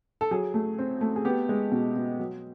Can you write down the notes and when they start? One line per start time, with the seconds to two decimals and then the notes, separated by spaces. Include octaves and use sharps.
0.21 A4
0.31 F#3 G#4
0.54 A3
0.79 C4
1.01 A3
1.16 G#4
1.25 B3 G4
1.49 G#3
1.72 B2
1.96 B2
2.19 F#3